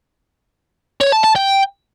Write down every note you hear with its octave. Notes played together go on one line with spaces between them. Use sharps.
C#5
A5
A5
G5